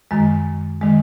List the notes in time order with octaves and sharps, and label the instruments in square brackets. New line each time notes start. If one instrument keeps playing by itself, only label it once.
[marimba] F#2 D#3 G#3
D#3 G#3